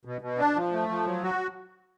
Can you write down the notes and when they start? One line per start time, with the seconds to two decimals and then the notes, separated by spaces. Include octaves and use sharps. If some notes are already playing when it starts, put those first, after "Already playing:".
0.05 B2
0.21 B2
0.38 D4
0.55 F3
0.72 A3
0.89 F3
1.06 F#3
1.23 F#4